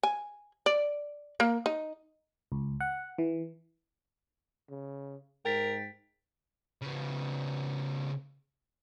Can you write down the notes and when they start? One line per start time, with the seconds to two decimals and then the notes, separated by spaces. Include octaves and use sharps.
0.03 G#5
0.66 D5
1.40 A#3
1.66 D#4
2.52 C#2
2.80 F#5
3.18 E3
4.70 C#3
5.45 G#2 A#4 G5 A6 B6
6.82 C#3 B3